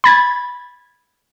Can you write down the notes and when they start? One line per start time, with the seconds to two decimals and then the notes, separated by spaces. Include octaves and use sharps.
0.04 B5 G#6 A6